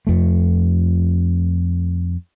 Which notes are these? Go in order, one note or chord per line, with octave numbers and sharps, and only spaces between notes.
F2 A3